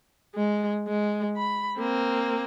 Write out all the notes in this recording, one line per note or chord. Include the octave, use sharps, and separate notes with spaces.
G#3
G#3
B5
A#3 C4